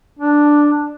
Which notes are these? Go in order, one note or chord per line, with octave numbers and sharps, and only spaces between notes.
D4